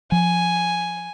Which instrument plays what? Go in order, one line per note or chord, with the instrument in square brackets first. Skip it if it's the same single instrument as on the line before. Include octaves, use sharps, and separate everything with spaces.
[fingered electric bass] F3 [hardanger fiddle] G#5